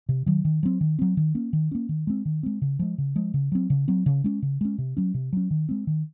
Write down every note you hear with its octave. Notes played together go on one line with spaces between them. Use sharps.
C3
D#3 F#3
D#3
F#3 C4
D#3
F#3 C4
D#3
A#3 C#4
D#3
A#3 C#4
D#3
G#3 C4
D#3
G#3 C4
C#3
F3 G#3
C#3
F3 G#3
C#3
F#3 C4
C#3
F#3 C4
C#3
G#3 C#4
C#3
G#3 C#4
C3
F#3 C#4
C3
F#3 C#4
D#3
G#3 C4
D#3